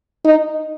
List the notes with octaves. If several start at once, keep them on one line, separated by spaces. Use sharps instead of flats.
D#4